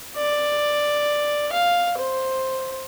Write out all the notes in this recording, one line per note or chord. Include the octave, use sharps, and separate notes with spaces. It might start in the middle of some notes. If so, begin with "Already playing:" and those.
D5
F5
C5